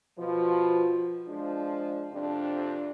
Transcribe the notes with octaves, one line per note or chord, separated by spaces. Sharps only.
B2 F3
F3 G#3 D4
F2 C3 D4